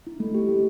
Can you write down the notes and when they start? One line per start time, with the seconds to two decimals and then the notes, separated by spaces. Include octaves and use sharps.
0.07 E4
0.20 A3
0.35 G4
0.49 A3